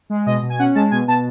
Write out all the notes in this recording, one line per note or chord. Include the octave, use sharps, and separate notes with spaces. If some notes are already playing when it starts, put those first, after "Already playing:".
G#3
B2 D#5
B2
G#5
C#4 F#5
G#3 A5
B2 G#5
B2 A5